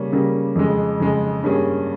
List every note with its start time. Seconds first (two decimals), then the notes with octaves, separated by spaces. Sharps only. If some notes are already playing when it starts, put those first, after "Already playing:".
Already playing: C#3 G3 A#3 C#4
0.12 C#3 G3 A#3 C#4
0.55 F2 C#3 G#3
1.00 F2 C#3 G#3
1.43 G2 G3 A#3 C#4 G#4